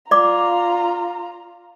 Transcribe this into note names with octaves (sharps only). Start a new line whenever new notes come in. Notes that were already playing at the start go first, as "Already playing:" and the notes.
F4 D5 A#5 D6